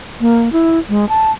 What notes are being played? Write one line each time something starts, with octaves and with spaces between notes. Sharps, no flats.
A#3
E4
G#3
A5